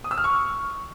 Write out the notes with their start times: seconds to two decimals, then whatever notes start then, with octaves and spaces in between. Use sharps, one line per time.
0.04 D#6
0.11 E6
0.18 F6
0.24 C#6